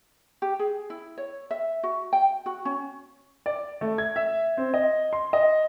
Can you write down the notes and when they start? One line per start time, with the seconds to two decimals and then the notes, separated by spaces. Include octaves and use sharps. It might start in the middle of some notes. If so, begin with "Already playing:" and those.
0.42 G4
0.59 G#4
0.90 E4
1.18 C#5
1.51 E5
1.83 F#4
2.13 G5
2.46 F#4
2.65 C#4
3.46 D5
3.81 A3
3.98 G#6
4.16 E5
4.57 C4
4.74 D#5
5.13 C6
5.33 D#5